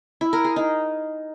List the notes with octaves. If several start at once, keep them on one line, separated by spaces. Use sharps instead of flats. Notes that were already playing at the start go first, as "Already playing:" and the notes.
E4
A#4
G#4
D#4